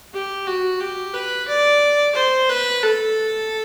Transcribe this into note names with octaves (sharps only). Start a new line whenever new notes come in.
G4
F#4
G4
B4
D5
C5
B4
A4